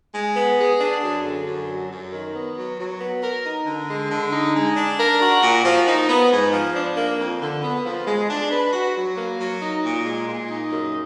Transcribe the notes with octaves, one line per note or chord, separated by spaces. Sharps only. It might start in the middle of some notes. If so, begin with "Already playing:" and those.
G#3
B3
G#4
D4
F#2
D3
F#2
F#3
F#2
D#3
B3
F#3
F#3
B3
A#4
D#4
D3
G#3
D3
D#4
G#3
D4
A#4
F#4
A#2
F3
D#4
B3
G#2
F3
D4
A#3
F2
D3
B3
F3
G#3
D4
B4
F#4
F#3
A#3
F#3
D#4
A#2
G#3
A#2
D#4
F#2